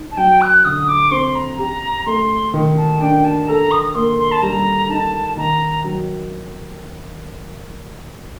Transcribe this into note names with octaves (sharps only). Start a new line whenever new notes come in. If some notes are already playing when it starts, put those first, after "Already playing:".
Already playing: D#4
A5
F#3 G5
F#6
D3 D#6
D6
C4 C6
A#5
G4 A#5
A3 C6
D#3
A5
D4 G5
A5
A4 A#5
D#6
A#3 C6
C6
A5
G3 A#5
D#4 A5
D#3 A#5
F#3